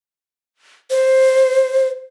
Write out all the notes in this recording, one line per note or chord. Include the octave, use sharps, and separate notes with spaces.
C5